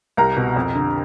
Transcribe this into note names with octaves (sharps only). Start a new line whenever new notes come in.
C2 A#4 A#5
B2
F2
D3